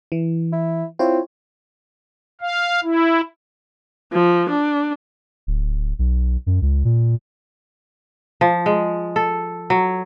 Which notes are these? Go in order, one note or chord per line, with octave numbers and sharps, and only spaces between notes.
E3
E4
C4 E4 F4 C#5
F5
E4
F3
D4
D1
B1
F#2
C#2
A#2
F3
G#3
A4
F#3